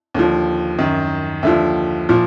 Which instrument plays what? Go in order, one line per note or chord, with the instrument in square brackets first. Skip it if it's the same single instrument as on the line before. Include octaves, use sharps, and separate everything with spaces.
[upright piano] D#2 D3 F3
F#2 D#3
D#2 D3 F3 E5
A#2 F3